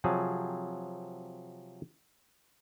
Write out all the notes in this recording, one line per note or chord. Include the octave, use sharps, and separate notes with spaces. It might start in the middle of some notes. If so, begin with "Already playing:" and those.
C3 F3 F#3 G#4